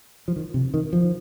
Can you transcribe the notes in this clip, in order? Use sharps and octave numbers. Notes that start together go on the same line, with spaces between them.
F3
D#3
C3
D#3
F3